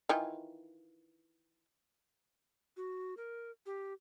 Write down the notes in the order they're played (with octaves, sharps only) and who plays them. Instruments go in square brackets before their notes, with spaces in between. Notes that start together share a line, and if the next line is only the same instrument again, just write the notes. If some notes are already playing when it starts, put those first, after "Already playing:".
[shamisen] D#3 E3 F4
[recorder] F#4
A#4
G4